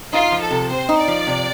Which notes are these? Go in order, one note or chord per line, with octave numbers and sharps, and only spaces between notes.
D#4 F4
F3
A4
C3
C4 C5
D#4
D5
F3
C3